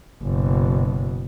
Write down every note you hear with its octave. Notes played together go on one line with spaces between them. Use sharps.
F#1 B2